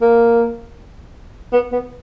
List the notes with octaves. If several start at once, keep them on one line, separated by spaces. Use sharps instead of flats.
A#3
B3
B3